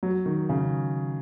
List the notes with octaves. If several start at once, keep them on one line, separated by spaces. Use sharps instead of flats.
F#3
D#3
C#3